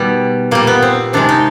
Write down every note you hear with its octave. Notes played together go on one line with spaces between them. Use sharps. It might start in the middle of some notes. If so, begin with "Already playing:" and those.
Already playing: B2 D#3 G3
A#2 G3 A#3
B3
C4
C3 D#3 G#3 D4
D#4